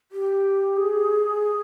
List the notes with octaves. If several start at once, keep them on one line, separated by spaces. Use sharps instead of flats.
G4
G#4